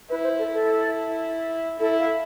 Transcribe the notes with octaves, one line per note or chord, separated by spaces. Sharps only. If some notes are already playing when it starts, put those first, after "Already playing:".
E4 B4
C5
A4
A4
E4
E4 A4
F5